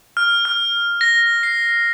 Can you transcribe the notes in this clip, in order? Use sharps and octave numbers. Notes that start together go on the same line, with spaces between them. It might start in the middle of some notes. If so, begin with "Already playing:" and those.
F6
F6
A#6
C7